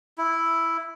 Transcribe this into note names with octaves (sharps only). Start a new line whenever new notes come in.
E4